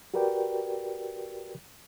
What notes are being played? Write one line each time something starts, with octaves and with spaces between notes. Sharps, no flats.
F#4 G4 A#4 B4 D5 G5